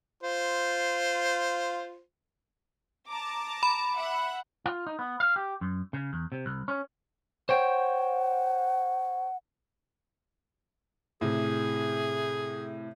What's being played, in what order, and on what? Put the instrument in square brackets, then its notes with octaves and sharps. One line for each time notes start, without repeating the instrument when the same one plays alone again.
[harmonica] F4 C5
[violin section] A5 A#5 D6
[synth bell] B5
[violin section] E5 F#5
[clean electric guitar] F4
D#4
B3
F5
G4
F#2
C#3
E2
C3
C2
C#4
[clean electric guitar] C5 C#5 G5 [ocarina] F#5
[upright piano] A2 C3 [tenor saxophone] G#4